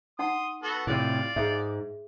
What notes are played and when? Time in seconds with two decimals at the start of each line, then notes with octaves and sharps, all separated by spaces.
0.19 D#4 F#5 C6 D#6
0.63 B3 F#4 A4
0.87 A2 C3 F4 D5
1.36 G#2 G#4 E5